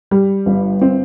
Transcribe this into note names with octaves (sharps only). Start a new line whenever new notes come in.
G3
G1
C4